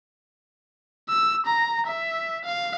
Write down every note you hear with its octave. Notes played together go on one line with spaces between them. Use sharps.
E6
A#5
E5
F5